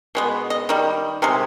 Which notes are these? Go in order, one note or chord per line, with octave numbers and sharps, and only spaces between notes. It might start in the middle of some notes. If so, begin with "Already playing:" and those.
B2 G#3 B3
D#5
D#3 G3
C3 D#3 G#3